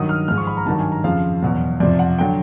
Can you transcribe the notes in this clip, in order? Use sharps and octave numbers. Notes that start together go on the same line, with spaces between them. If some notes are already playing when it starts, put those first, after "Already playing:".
Already playing: G2 D#3 F#3 D#6
F6
G#2 F3 F6
C#6
B5
A#5
G2 D#3 F#3 A5
G#5
A#5
F2 C#3 F3 F5
E2 B2 F#3
F2 C3 F3 D5
F#5
D3 F#3 G5